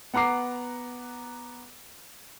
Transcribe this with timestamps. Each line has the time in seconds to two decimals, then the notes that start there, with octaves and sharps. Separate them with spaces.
0.14 B3 F#5 A#5 D6 C7